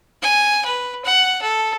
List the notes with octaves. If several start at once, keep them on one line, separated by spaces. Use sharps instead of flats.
G#5
B4
F#5
A4